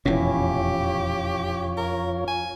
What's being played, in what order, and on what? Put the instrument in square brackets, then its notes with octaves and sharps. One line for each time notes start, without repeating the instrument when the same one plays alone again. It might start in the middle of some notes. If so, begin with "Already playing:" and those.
[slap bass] E1 A#2 [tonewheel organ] F2 F4 C#5 [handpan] C#4 E4 [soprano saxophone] G4
[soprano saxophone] A#4
G#5